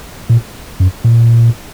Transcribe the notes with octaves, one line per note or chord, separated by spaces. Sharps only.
A#2
F#2
A#2